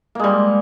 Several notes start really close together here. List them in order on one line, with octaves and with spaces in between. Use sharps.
A#3 G#3 G3